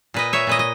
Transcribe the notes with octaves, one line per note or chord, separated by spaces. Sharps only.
A#2 B4 D#5
C#5 E5
A#2 B4 D#5
D#5